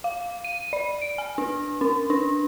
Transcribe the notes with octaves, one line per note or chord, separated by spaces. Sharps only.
F5
D#7
D5
D7
G#5
D4
C#4
D4